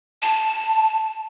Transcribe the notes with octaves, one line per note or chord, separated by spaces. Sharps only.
A5